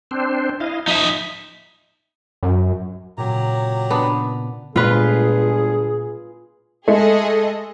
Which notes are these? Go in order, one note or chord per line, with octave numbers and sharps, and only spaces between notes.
C4 D4 C5
E4 D#5 F5
F3 D#4 E5
F#2
A#2 C#3 F#3 G4 A#5
B3 D4
G1 A#2 G#3 A3 F4 G#4 B4
G#3 A3 G#4 A4 D#5